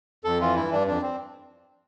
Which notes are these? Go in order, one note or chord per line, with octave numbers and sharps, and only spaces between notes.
F2 A4
E3 F4
G2 E4
G2 D4
F2 D4
C4